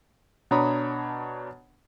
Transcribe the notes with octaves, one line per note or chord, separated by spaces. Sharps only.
B2 D4 C#5 A#5 B5 D#6